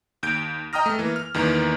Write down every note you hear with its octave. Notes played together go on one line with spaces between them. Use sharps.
D#2 G6 D7
D#5 G5 A#5 D#6 F6 A#6
A3 A4
E3 A#3
F6
E2 D#3 E3 A#3 B3